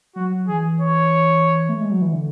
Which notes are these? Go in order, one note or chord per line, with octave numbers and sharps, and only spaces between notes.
F#3 F#4
E3 G#4
C#5
A3
G#3
F#3
E3
D3